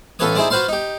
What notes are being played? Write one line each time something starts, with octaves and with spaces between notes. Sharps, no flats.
A1 F4 A4 B4 C#5 D#6
D#4 E4 G#4 C5 D5
F4 F#4 B4 C5 F5 C6
D#4 G4